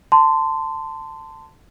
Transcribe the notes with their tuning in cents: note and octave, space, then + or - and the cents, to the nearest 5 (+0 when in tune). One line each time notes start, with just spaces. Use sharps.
A5 +15 C6 -15